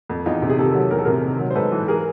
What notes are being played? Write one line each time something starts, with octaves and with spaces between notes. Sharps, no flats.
F2
E2 D#4 F4
C3
G#4
D#3 G4 A4
F#3
E2 A#4
A4
C3 G#4 A#4
D#3
F#3
C5
G#2 A4 B4
E3
G#4 A#4